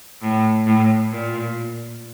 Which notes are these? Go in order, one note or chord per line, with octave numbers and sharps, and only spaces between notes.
A2
A2
A#2